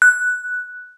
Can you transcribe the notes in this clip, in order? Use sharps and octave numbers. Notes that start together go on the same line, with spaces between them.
F#6